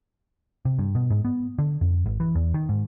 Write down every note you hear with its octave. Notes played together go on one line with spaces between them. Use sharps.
C3
G2
B2
G#2
B3
D3
F2
G#1
E3
E2
D#3
G#2